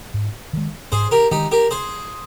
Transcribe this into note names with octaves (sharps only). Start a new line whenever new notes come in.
G#2
D#3 G#3
G#2 G#4 C5
G4 A#4
D#3 G#3 D#4 G4
G4 A#4
G#4 C5